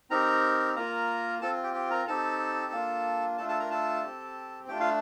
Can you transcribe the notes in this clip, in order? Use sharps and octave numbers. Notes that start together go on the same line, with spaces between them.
C4 D#4 G4 A#4 A#5
A#3 F4 A#4 A#5
C4 F4 A4 A5
G4 G5
G4 G5
A#4 A#5
C4 D#4 G4 A4 A5
A#3 D4 F4
A3 D4 F4 A4 A5
A4 A5
A#4 A#5
A4 A5
C4 G4
A3 D4 F4 G4 G5
F4 F5